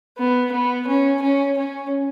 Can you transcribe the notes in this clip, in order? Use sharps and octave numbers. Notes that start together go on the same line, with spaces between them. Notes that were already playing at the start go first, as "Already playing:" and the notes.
B3
B3
C#4
C#4
C#4